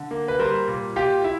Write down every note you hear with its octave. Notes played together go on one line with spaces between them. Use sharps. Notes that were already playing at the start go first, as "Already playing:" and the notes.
Already playing: D3
A#3
B4
G3 A#4 C5
A#2
A#2 F4 G4
E4